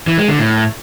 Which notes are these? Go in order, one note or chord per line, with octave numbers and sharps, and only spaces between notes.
E3
G#3
D3
A2